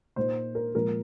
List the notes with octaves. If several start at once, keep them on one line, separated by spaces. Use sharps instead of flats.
A#2 A#3 D#4 C5
A#4
A#2 F3 G#3 A#4